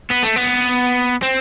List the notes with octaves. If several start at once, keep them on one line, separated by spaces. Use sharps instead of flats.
B3
A3
B3
C4